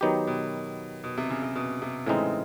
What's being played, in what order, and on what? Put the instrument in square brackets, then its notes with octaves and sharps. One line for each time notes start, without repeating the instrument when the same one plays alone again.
[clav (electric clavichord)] D#3 F#3 B3 D#4 G4
[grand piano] B2
B2
C3
C#3
C3
B2
C3
[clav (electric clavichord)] A2 E3 G#3 C4 D#4 [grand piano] C#3